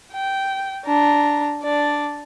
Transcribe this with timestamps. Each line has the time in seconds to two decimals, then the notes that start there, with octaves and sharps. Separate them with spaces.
0.12 G5
0.86 D4 A#5
1.63 D4 D5